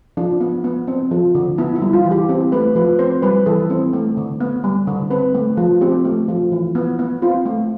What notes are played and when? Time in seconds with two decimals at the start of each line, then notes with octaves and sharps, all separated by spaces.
0.17 F3 D4
0.41 B3
0.64 B3
0.88 C4
1.11 F3
1.35 D3
1.58 B3 E4
1.76 E4
1.82 G3
1.93 F4
2.05 E3
2.11 G4
2.29 C4 G4
2.52 A3 B4
2.75 F3 B4
2.99 C4 C5
3.22 G3 B4
3.46 E3 A4
3.70 C4
3.93 A3
4.17 D3
4.40 B3
4.64 G3
4.87 D3
5.10 C4 B4
5.35 A3
5.57 F3
5.81 C4 G4
6.05 A3
6.29 F3
6.52 E3
6.75 B3
6.99 B3
7.22 C4 F4
7.46 A3